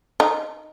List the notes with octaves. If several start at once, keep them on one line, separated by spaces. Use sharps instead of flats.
D#4